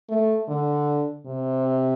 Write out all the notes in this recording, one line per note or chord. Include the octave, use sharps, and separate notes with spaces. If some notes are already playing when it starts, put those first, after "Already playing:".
A3
D3
C3